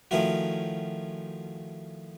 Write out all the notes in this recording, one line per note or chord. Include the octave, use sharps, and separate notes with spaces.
D#3 F3 A3 C#4 E4 F#4